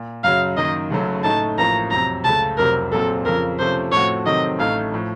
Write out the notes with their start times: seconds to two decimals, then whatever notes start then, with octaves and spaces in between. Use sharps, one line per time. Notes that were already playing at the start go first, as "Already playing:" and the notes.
Already playing: A#2
0.24 F#2 C#3 F#3 F5
0.57 F#2 D#3 A#3 D#4 D#5
0.91 F#1 F#2 C#3 F#3 A3
1.24 A2 A3 D#4 A5
1.58 A1 A2 F3 A#3 A#5
1.91 F2 C3 F#3 A#5
2.25 C#2 C#3 A3 A5
2.58 F1 F2 C3 F#3 A#4
2.91 A#1 A#2 F#3 C4 A4
3.25 F2 C#3 F3 A#4
3.59 C3 F3 A3 C#4 C5
3.92 A2 F3 A3 C4 F#4 C#5
4.25 C3 D#3 F#3 A3 C4 D#5
4.59 A1 A2 A3 D#4 F5
4.93 A2 F3